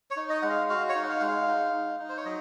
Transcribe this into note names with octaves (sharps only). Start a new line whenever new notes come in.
C#5
D#4
D#5
G#3 F#5
F5
F#4 F5
C#5
D#4
F#5
F5
G#3 F#5
F5
D#4
D#4
D#4
C5
C#5
F#3 D#5